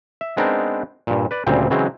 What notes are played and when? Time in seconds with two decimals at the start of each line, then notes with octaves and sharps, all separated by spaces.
0.21 E5
0.37 G#3 B3 C4 D4 D#4 A#4
1.07 G2 A#2
1.31 B4 D5
1.47 D2 A#2 C#3 G3 C4
1.70 C#3 E3 F#3 G#3 C4